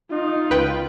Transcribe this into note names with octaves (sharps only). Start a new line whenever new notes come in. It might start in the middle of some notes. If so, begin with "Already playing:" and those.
D#4 F4
C#2 B4 G5